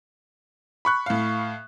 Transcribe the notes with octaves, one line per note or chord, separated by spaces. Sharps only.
B5 C#6 F#6
A2 F5